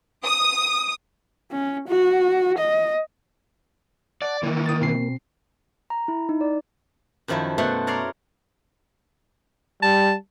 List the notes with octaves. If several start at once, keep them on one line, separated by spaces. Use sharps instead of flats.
D#6
C#4
F#4
D#5
D5 F#5 A5
D#3 E3 A#3
D#6 A6
B2 C4 C7
A#5
E4
D#4
D5
F#2 D#3 F3 A3 E4
B2 A3 C5 F#5 C6
A#4 C#5 D5 A#5 C6
G3 A5